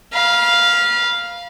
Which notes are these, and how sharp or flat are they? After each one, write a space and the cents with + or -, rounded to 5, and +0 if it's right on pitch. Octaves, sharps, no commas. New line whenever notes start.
F5 +0 B5 -40